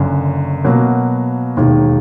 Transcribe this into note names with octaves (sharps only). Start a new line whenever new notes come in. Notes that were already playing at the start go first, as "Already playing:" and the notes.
Already playing: F#1 F#2 D3
B2 F#3 A#3
E1 D#2 D#3